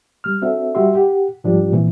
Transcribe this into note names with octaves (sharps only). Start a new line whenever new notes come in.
G3 F6
C4 D4 F#4 A4 E5
G3 F#4 G4 E5 C6
G4 F#5
G#2 F3 G3 D4 F4 G4
A#2 E3 C4